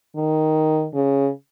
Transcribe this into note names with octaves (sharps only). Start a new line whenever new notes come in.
D#3
C#3